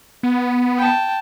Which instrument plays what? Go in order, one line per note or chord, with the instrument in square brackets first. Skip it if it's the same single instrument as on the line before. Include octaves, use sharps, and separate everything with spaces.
[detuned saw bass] B3
[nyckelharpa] G5 A5